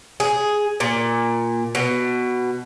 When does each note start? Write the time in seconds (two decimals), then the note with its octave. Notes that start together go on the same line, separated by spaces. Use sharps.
0.20 G#4
0.80 A#2
1.75 B2